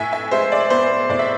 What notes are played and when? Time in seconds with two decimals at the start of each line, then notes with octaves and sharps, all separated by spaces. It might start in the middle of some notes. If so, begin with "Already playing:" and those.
Already playing: A2 E5 G#5
0.13 E5 G#5
0.31 G#3 C5 E5
0.52 D5
0.70 B3 C5
1.09 A2 D5
1.19 E5